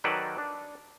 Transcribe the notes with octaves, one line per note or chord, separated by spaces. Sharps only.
D#3 F#3 A4 B4 D5
D4